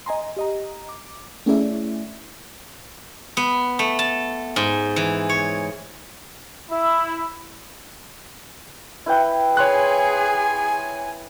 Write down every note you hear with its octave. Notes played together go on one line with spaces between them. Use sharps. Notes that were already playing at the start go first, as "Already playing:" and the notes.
D#5 G#5 A#5 C6
G4 D#5 A#5
D6
A3 C#4 E4 G#4 D5 E5
B3
A3
A5
G#2
E3
C#5
E4
E4 B4 G5
G#4 C#5 G#5 C6 F#6